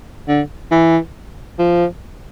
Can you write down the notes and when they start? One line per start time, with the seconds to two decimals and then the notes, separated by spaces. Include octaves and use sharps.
0.28 D3
0.71 E3
1.59 F3